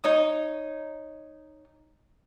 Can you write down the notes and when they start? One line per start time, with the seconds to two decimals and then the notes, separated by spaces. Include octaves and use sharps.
0.04 D#4 C#5 D#6